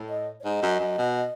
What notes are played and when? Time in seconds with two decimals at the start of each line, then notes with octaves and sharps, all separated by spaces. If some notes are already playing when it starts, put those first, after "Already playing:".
Already playing: A2
0.09 D#5
0.40 C#5
0.44 G#2 D#5
0.62 F#2
0.80 F#2
0.98 B2